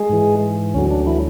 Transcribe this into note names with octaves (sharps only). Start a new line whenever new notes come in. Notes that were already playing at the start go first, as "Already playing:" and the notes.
Already playing: G#3 G#4
G#2 E3
D2 D3 F#3 C#4
D4
E3 E4